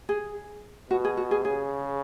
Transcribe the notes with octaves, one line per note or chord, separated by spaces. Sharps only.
G#4
B2 F#4
G#4
F#4
G#4
C#3 G#4